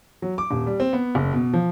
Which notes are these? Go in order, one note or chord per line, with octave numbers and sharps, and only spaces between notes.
F#3
D6
D#1
G3
C4
B3
F#1
B2
F3